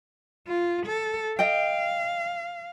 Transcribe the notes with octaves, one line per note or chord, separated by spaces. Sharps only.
F4
A4
D#5 F5 G5